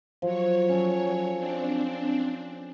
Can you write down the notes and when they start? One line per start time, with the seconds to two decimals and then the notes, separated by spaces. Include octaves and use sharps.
0.22 F3 F#3 C#5
0.69 C#4 G#4 A4
1.37 C4 D4